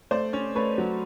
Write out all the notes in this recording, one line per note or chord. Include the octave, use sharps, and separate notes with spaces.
A3 C5 D5
C#4
A3 B4 C#5
F#3